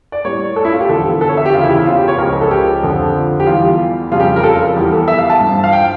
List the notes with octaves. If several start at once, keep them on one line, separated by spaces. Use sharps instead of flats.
D5
A2 G3 C#5
A4
E4
F4
G4
E2 D3 F3 A4
A4
C#5
E5
G4
E2 C#3 F3 F4
E4
E4
F4
G4
C#5
C#2 C#3 F3 A#4
A4
G4
F2 D3 F3
G4
E2 E3 G3 F4
F2 C#3 G3 F4
G4
A#4
A4
F4
E2 E3 G3 G4
A4
E5
F5
A5
G2 F3
F5
G5